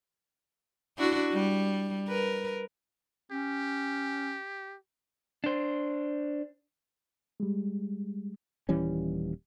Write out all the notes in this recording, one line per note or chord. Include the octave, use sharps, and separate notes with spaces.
D4 E4 F#4
G3
A#4 B4
C#4 G4
D4 C5
G3 G#3
D#1 E3 G3 C#4